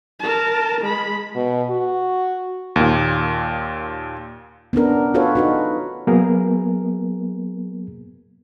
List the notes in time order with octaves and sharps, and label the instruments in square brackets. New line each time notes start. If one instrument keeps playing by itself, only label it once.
[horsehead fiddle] A#4 A5
G#3 B5
[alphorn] B2
F#4
[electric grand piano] D#2 A#2
[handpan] B3 C#4 D4 A#4
F4 F#4 A4 B4 C#5 F5
D#4 F#4 B4
[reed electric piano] F#3 A#3 B3 G#4 A#4